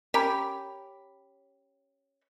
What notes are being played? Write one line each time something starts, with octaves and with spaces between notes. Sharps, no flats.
C#4 G4 A#4 B5